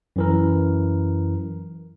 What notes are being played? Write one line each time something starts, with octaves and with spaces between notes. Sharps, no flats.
F#2 E3 A#4